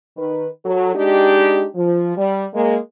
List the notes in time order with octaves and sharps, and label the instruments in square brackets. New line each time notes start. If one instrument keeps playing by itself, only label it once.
[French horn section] D#3 B4
F#3 A4
G#3 D4 D#4 G4
F3
G3
G#3 A#3